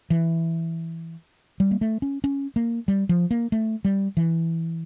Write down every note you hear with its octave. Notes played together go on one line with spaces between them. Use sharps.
E3
G3
A#3
A3
C#4
C#4
A#3
G3
F3
A#3
A3
G3
E3